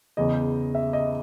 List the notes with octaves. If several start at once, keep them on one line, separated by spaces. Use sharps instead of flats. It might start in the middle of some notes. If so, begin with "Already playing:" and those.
E2 C#3 E3 D#5
E5
D#5